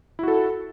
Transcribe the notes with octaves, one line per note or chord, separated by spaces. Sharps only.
E4 F#4 A4